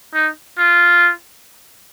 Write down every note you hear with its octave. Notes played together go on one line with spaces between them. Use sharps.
D#4
F4